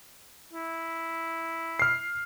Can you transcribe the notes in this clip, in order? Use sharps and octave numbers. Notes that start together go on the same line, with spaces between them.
E4
F6 C7